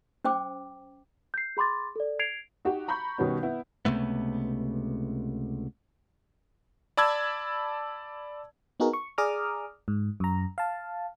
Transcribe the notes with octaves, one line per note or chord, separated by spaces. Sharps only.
C#4 C5 G5 D6
G6 C7
G#4 B5 C6 D6 A6
A4 D5
G#6 C7 D7 F7
D#4 F#4 G4
A#5 B5 C#6 G6
B2 D#3 G3 B3 C#4
B3 E4
C#2 C3 A3 B3
D5 A5 B5 E6 G#6
B3 D#4 F#4 G#4 A#4
C#6
G#4 D5 A#5 D6 D#6 F6
G#2
F#2 A#5
F5 A5